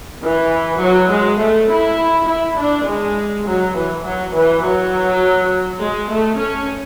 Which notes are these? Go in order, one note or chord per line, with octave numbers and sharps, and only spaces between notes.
E3
F#3
G#3
A3
E4
E4
D4
G#3
F#3
E3
F#3
E3
F#3
G#3
A3
C#4